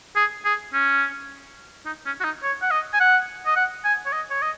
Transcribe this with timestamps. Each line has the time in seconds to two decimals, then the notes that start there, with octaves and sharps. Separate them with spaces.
0.16 G#4
0.45 G#4
0.74 C#4
1.86 D#4
2.06 C#4
2.20 F#4
2.24 D#4
2.43 C#5
2.62 F#5
2.71 D#5
2.93 G#5
3.00 F#5
3.46 D#5
3.56 F#5
3.85 G#5
4.06 C#5
4.13 D#5
4.30 C#5
4.42 D#5